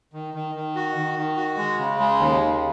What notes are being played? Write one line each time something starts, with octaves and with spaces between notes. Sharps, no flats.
D#3
D#3
D#3
F#4
D#3
D#3
F#4
G#3
C#3
G#3
D#2
C#3